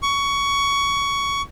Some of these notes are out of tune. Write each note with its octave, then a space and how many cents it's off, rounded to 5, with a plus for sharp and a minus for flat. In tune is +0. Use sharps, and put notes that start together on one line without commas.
C#6 +15